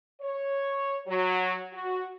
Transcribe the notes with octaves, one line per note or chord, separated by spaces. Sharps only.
C#5
F#3
F#4